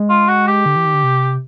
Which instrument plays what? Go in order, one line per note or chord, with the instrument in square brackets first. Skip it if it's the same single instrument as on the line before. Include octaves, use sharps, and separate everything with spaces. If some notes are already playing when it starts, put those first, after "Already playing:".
Already playing: [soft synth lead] G#3
[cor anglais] F4
F#4
G4
[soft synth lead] D3
E3
D#3
D3
C3